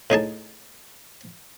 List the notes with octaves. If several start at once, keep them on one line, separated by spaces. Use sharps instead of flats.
A2 D#4 G#4 A5